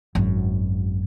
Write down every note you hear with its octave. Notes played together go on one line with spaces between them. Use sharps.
G#1 F#2